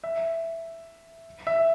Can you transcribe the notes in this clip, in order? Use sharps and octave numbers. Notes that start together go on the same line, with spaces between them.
E5
E5